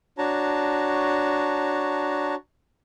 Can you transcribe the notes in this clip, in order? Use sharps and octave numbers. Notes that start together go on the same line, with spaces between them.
D4 F#4 C#5 A5 A#5